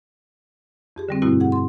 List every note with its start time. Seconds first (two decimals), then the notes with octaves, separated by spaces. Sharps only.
0.96 F2 G4 G#4
1.09 D3 G3 C4
1.22 G2 B2 A3 C4 E4 F#4
1.40 G#4 F#5
1.52 C6